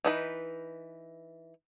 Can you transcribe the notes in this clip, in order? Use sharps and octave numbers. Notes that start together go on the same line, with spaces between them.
E3 D#4 B4